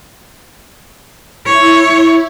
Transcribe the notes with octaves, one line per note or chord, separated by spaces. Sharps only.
E4 C#5